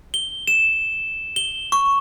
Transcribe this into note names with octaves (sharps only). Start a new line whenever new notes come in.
G7
E7
G7
C#6